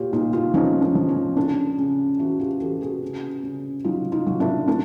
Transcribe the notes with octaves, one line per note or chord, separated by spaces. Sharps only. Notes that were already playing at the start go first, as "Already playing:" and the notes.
Already playing: A#2 F4 G4 C#5
A#2 D#4 F4
D#4 F4
F3 C#4 D#4
D4
F3
C#4
C#3 D4
C#3
E3 E4 F#4
F4 G4
E3 G4 A4
F#4 G#4
C#3
C#3
F#3 D#4 F4
D#4 F4
F#3
D4 E4
A2 D4